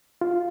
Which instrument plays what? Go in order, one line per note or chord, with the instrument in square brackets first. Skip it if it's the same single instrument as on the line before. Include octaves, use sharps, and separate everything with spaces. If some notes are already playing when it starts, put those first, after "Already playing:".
[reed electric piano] F4